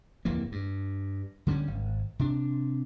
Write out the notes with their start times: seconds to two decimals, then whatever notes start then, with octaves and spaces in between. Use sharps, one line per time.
0.25 D1 F2 E3 A#3
0.52 G2
1.47 D3 G3 A#3 C#4
1.68 G#1
2.19 C3 D4